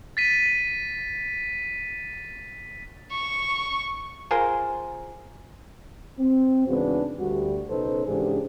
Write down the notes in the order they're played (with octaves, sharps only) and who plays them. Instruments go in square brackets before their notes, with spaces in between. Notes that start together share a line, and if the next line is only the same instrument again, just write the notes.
[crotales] A6 B6 D#7
[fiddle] C#6
[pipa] F4 G#4 A#4 C5
[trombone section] C4
E2 G#2 C#3 D4 F#4 B4
D2 G3 F#4
B1 C#3 D#4 A4 B4 C5
G#2 C#3 E3 D4 G4 G#4